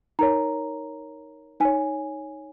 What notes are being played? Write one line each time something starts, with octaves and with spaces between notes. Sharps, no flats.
D#4 A#4 C#5 A#5
D#4 C#5 G#5